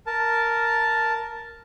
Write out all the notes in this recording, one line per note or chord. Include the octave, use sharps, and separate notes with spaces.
A#4 A5